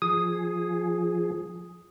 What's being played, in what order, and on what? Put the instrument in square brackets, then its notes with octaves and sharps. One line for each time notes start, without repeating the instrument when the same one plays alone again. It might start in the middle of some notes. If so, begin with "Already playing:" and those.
[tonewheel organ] F3 G#4 [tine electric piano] D#6